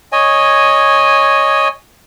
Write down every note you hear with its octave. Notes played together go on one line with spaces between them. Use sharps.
C#5 D#5 G#5